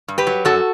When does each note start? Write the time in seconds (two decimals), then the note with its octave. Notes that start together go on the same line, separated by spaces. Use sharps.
0.08 G2
0.18 G4 B4
0.27 F#3
0.45 F#2 F#4 A4